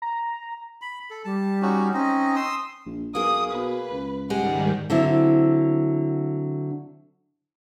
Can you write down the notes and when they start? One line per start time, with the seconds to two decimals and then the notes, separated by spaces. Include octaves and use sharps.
0.02 A#5
0.82 B5
1.10 A4
1.25 G3 A5
1.62 C#4 D#4 F#4
1.94 C4 C#4 D#4 D#5
2.36 C6 D#6 E6
2.86 A#1
3.15 B1 A#3 G#4 D#6
3.53 B2 B4
3.91 C#2
4.30 G#2 D#3 G3 G#3 G4 G#4 F#5
4.90 D3 F#3 C4 E4